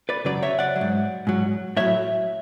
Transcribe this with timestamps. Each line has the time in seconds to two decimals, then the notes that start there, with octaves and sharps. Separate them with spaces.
0.09 B4 D5
0.25 F#2 C#3 F#3 B4 D5
0.43 C#5 E5
0.59 D5 F#5
0.76 F#3
0.81 G#2
1.27 G#2 F#3
1.77 A2 F#3 C#5 E5